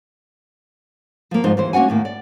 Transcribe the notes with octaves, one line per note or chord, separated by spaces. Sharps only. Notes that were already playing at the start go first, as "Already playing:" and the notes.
F3 A#3
G#2 F3 D#4 C5
D#2 E3 C5
A#3 C#4 F#4 F#5 G#5
D#2 A2 A#3
D5